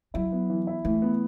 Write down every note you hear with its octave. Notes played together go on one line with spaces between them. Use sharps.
F#3 E4
B3
E3
E4
E3 A3
B3